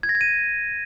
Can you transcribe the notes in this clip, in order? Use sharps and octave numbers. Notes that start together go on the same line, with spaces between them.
G#6
A#6
G#6
D#7